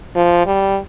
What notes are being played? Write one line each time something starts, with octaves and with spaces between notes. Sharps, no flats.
F3
G3